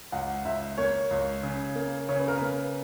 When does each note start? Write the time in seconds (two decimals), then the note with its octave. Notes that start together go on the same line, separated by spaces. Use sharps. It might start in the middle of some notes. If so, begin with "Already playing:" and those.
0.12 C#2 F#5
0.45 C#2 E5
0.78 A#3 C#5
1.11 C#2
1.43 C#3
1.76 A#3
2.09 C#3 C#5
2.18 B4
2.28 A#4
2.38 A#3 B4